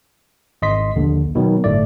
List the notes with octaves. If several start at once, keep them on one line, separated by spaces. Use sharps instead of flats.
G#1 D#5 C6 B6
A#1 D#2 D3
B2 D#3 F#3
G1 A2 A3 D5